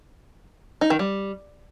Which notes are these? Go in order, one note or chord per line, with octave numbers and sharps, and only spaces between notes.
D#4
D#3
G3